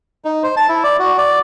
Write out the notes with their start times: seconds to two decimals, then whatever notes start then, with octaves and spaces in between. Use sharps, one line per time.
0.25 D#4
0.43 C5
0.57 A5
0.69 E4
0.84 D5
0.99 F#4
1.18 D5